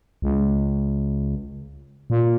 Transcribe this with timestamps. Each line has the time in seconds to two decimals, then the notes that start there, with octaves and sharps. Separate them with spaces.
0.22 C#2
2.10 A#2